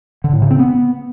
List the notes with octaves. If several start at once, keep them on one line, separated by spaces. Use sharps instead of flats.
D3
A2
C#3
C4
B3